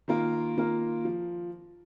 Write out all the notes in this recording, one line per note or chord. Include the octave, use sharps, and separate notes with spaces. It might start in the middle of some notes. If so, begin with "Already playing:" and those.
D#3 A#3 F4 A#4
D#3 A#3 F4 A#4
F3